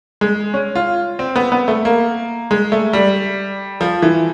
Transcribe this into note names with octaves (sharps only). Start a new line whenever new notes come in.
G#3
C#4
F4
C4
B3
B3
A3
A#3
G#3
A3
G3
F3
E3